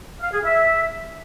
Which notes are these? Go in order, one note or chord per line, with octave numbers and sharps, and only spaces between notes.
F5
G#4
E5